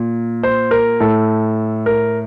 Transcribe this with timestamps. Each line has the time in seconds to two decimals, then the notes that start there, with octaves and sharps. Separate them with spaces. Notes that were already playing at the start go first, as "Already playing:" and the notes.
Already playing: A#2
0.43 C5
0.71 A#4
1.00 A2 A4
1.86 A#4